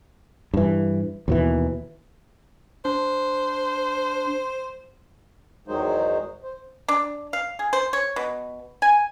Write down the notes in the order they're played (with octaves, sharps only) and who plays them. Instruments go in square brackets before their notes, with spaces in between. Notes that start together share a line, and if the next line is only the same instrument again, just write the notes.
[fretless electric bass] G2 E3
D#2 B2 E3
[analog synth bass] D4 [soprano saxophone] C5
[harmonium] E2 D#3 F#3 G#3 D#4 C5
C5
[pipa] D4
F5
G#4
C5
C#5
B2
G#5